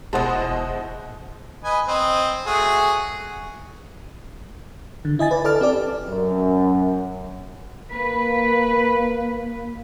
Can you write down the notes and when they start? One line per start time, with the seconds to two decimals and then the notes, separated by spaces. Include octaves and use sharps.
0.13 E1 B2 G#3 E4 C5 D#5 F#5 A5
1.64 B4 D#5 G#5
1.87 C4 D#5
2.47 A3 F#4 G#4
5.05 D3
5.19 E4 D#5 G#5 A6
5.31 B4 D5
5.44 A4 D5 A5 D6 F6
5.61 C4 G4 D5
6.08 F#2
7.91 A#3 B4